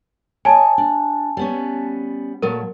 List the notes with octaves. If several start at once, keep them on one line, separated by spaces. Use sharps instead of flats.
C#5 D#5 G#5 A5
D4
G3 B3 C#4
A#2 F#3 A3 A#4